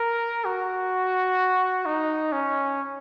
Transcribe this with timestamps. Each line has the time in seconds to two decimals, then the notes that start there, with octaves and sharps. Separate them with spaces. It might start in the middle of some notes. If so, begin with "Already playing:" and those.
Already playing: A#4
0.45 F#4
1.86 D#4
2.32 C#4